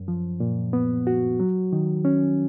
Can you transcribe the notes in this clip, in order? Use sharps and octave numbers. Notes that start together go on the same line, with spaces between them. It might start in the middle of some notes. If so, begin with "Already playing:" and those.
Already playing: F#2
F3
A#2
B3
F#4
F#3
D#3
C#4